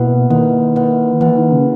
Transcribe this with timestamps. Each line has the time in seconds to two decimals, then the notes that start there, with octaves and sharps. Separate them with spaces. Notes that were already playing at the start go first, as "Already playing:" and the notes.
Already playing: B2 A#3 E4 B4 F#5
0.30 D#3 A#3 E4 B4 F#5
0.76 A#3 E4 B4 F#5
1.21 E3 A#3 E4 B4 F#5
1.37 D#3
1.52 C#3